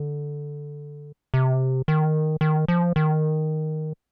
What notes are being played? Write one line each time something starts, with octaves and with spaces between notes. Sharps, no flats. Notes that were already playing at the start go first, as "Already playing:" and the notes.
Already playing: D3
C3
D#3
D#3
F3
D#3